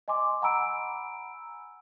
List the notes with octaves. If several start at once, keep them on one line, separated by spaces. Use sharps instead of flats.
D#5 G#5 C6 D6
F#5 G#5 A#5 B5 E6 D7